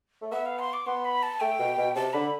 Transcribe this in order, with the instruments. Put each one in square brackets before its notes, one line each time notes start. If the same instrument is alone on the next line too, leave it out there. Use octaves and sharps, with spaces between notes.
[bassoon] A3
[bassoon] B3 [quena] E5
[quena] F5
C6
D6
[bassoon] B3 [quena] C6
[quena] B5
A5
[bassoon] A3 [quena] G5
[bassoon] B2
B2
[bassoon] C3 [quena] A5
[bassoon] D3 [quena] B5